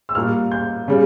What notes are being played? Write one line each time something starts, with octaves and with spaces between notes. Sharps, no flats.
E6
A#2 G3 A#3 F6
G6
C#3 G3